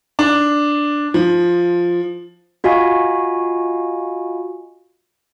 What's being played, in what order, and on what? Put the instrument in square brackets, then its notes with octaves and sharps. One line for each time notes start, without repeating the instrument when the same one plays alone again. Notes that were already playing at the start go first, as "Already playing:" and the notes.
[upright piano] D4
F3
[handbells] F4 F#4 D#5 F5 G#5 B5